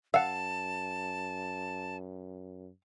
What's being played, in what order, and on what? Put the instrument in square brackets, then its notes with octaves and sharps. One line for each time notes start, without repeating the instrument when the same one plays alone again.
[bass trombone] F#2 [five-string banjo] F5 [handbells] F#5 E6 [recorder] A5